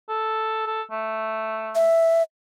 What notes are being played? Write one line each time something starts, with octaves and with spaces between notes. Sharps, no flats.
A4
A4
A3
E5